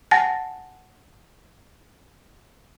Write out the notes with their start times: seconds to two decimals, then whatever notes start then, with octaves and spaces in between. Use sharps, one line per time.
0.11 F#5 G#5 A5 A6 A#6